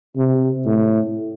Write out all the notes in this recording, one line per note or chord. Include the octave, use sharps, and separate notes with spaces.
C3
A2